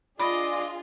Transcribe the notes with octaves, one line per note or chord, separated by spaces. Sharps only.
D4 F4 G#4 D5 D#5 B5